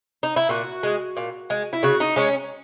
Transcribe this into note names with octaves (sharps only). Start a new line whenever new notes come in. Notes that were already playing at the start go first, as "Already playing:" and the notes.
D#4
E4
A#2 F#4
G#3
A#2
G#3
E4
C#3 F#4
D#4
G#3 C#4